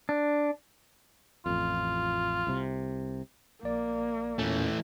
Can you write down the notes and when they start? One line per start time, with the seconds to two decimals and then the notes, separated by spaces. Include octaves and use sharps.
0.09 D4
1.46 A1 F2 F4
2.47 C2 C3
3.63 A#1 A#3 D5
4.39 E2 A#2 E3 A3 C#4